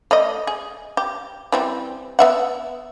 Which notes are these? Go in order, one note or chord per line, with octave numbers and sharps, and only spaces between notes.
A3 D5 D#5
G#4
G4
E3 G3 C4
B3 E5 F#5